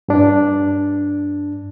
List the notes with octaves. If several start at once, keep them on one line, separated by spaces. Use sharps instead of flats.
G2 D4